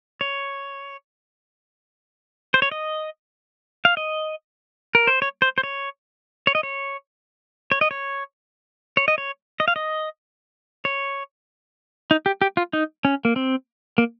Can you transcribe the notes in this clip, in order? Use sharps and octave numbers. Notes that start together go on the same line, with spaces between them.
C#5
C5
C#5
D#5
F5
D#5
A#4
C5
C#5
C5
C5
C#5
C#5
D#5
C#5
C#5
D#5
C#5
C#5
D#5
C#5
D#5
F5
D#5
C#5
D#4
G4
G4
F4
D#4
C#4
A#3
C4
A#3